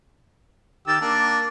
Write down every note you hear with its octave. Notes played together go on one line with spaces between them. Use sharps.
D#3 G4 E6 A6
A#3 D4